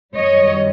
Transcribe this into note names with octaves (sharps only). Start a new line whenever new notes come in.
F#2 D#3 G3 C#5 D#5